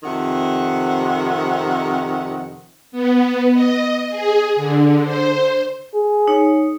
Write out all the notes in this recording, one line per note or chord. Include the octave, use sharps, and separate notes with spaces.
F2 C3 D#3 F#5
B3
D#5
G#4
D3
C5
G#4
D#4 C#5